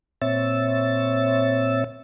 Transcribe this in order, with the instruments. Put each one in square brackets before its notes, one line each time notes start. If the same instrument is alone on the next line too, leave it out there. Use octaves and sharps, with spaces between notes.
[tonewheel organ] A#2 C4 C#5 E5 E6 A6